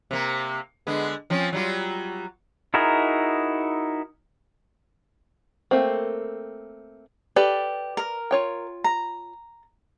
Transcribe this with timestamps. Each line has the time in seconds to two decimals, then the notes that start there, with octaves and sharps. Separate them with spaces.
0.11 C3 A#3
0.87 D3 G#3 B3
1.30 F3 C4 C#4
1.53 F#3 G3 F4
2.74 D#4 E4 F#4 G#4 A#4
5.71 A3 A#3 C4
7.36 G4 A4 B4 D5
7.97 A#4
8.31 F4 C#5 G5
8.84 A#5